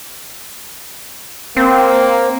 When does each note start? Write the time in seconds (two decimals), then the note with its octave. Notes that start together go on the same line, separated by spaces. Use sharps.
1.57 A#3 C4